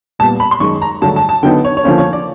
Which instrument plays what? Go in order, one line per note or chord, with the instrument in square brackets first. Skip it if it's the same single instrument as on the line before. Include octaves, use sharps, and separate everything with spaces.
[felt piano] A#2 G3 B3 [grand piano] A5
[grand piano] B5
C6
[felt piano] F#2 D#3 G#3 [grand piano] C#6
[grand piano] A#5
[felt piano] G2 D3 F#3 A3 [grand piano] A5
[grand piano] A5
A5
[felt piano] D3 F#3 B3 D#4 [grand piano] G5
[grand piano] C#5
C#5
[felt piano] D3 F3 A#3 C#4 [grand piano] C5
[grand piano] C#5
D5